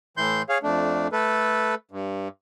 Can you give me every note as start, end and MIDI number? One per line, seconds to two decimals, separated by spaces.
0.17 0.42 45
0.17 0.42 52
0.17 0.42 84
0.17 0.42 91
0.49 0.58 68
0.49 0.58 73
0.49 0.58 77
0.63 1.08 41
0.63 1.08 57
0.63 1.08 62
1.12 1.75 57
1.12 1.75 69
1.12 1.75 71
1.91 2.28 43